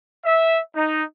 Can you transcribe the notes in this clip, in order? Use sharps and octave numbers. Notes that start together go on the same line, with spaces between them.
E5
D#4